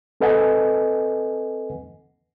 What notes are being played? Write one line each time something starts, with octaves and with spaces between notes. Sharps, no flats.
C4 A4 B4 D#5 F#5 G#5